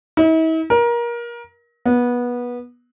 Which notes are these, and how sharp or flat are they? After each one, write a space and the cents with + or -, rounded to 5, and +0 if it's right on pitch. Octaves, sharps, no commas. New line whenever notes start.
E4 -45
A#4 +25
B3 -20